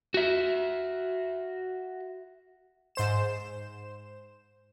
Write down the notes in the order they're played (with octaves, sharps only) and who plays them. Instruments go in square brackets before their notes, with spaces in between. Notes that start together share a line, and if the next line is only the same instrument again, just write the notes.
[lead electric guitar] F#4 E5
[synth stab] G#2 C5 E7